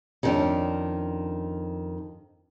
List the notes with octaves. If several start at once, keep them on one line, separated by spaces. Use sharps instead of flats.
F2 D#3 G#3 B3 C#4 D4